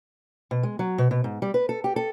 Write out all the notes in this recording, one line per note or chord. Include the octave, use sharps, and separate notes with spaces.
B2
G#3
F#3
B2
B2
G#2
G3
B4
A4
G4
A4